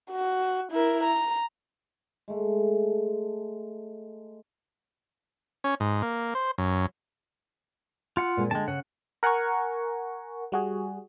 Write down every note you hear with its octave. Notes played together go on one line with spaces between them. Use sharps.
F#4
E4 A#4
A#5
G#3 A3
C#4
G#2
A#3
C5
F#2
F4 F#5
A#2 G#3 C4
D3 G#3 G5 A5
C#3 F#5
A#4 F#5 G#5 A#5 C#6
G3 F#4 G#4